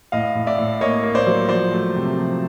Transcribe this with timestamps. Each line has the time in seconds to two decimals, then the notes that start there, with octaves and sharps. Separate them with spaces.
0.12 A2 D#5 F5
0.35 A2
0.47 D5 E5
0.58 A2
0.81 A#3 C#5 D#5
1.03 A#3
1.15 C5 D5
1.27 F#3
1.49 F3 C5 D5
1.72 A3
1.95 C3
2.17 F3